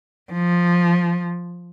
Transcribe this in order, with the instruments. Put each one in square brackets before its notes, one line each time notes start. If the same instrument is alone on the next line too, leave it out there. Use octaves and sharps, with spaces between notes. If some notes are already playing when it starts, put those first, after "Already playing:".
[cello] F3